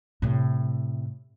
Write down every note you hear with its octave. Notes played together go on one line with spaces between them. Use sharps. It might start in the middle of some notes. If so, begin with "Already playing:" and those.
A2 C3